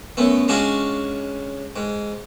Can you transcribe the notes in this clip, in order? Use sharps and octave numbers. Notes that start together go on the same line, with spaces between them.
F#2 A3 B3
G#3 C#4 D4 F4 F#4
G#2